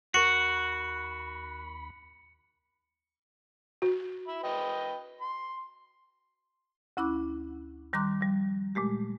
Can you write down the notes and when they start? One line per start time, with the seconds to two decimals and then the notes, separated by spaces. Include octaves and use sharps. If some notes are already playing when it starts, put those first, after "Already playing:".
0.14 D#2 F#4 A#4 B5 C#6 C#7 F#7
3.82 F#4
4.27 E5 B5
4.43 B4 D#5 G5
5.21 C6
6.97 D2 C#4 E4 B5 D6 F#6
7.93 D#3 G3 A#5 C6 D6 F#6
8.21 F3 G3
8.75 A#2 G#3 A3 G4